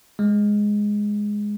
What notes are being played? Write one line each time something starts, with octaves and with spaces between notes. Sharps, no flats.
G#3